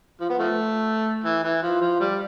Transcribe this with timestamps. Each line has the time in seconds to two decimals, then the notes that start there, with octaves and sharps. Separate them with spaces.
0.20 F3
0.30 B3
0.39 F3 A3
1.24 E3
1.43 E3
1.63 F3
1.81 F3
2.00 G3